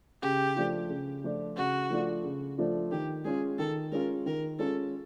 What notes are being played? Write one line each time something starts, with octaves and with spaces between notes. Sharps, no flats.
C#3 G4
F3 A3 D4 F4
C#3
F3 A3 D4 F4
C#3 F#4
F3 A3 D4 F4
C#3
F3 A3 D4 F4
D#3 G4
G#3 C#4 F4 G#4
D#3 A4
G#3 C#4 F4 A#4
D#3 A#4
G#3 C#4 F4 A4